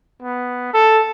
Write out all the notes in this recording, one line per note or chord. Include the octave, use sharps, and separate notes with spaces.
B3
A4